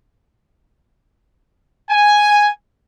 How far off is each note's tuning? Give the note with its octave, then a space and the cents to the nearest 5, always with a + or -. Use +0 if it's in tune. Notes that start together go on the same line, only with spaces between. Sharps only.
G#5 +0